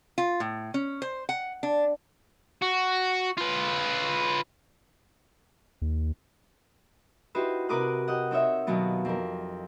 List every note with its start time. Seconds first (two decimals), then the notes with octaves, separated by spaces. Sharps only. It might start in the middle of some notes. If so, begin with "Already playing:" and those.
0.18 F4
0.40 A2
0.74 C#4
1.02 C5
1.29 F#5
1.63 D4
2.62 F#4
3.37 F4 B4
5.82 D#2
7.35 D#4 E4 F#4 G4 B4 C5
7.69 C3 A#4 B4 D6 D#6 F#6
8.08 G4 D#5 F#5
8.31 C4 D#4 C#5 E5
8.67 B2 D#3 F#3 B3 F4
9.05 F2 A#4